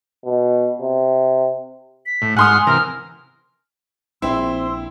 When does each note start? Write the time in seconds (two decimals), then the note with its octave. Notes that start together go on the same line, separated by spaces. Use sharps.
0.25 B2
0.81 C3
2.06 B6
2.22 A2
2.37 G#2 F#5 G#5 C6 D#6 F6
2.67 C3 E3 A#4 F6
4.22 A#1 C4 E4 C6 E6